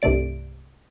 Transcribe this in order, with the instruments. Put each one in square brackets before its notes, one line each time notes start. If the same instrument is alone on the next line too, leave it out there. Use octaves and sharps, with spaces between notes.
[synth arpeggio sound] C2 G2 C3 A3 D5 D7